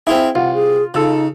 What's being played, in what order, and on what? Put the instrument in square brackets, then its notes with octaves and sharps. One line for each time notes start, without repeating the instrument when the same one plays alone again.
[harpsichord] C4 F4 G#4 [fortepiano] E4
[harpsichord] C2 [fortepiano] F4 [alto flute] F#5
[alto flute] G#4
[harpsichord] C#3 [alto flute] D#4 [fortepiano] F4 A4